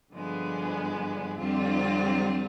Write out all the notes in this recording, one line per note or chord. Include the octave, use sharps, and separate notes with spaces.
G2 D3 F3 G#3 B3
F2 D3 G3 C4 F4